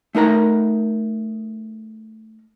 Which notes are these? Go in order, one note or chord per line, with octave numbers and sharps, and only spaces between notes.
A3 D#4 A#4 A#5